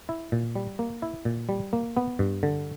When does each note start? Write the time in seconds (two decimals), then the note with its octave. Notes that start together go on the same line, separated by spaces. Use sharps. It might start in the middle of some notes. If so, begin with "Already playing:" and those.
0.09 E4
0.32 A#2
0.55 G3
0.79 A#3
1.02 E4
1.25 A#2
1.49 G3
1.73 A#3
1.97 B3
2.19 G2
2.43 D3